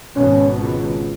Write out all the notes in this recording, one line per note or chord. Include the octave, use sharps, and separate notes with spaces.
G#1 B2 C#4
C#2